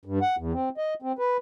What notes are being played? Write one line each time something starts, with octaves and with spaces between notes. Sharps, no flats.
G2
F#5
E2
C4
D#5
C4
B4